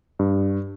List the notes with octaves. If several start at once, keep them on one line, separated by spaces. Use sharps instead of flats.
G2